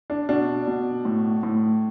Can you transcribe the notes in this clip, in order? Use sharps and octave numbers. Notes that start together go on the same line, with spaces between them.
D4
B2 D4
B2
A2
A2